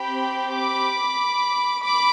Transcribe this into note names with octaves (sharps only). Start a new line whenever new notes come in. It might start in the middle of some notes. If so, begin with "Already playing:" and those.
Already playing: C4 G4 G5 B5
B5 D6
B5 D6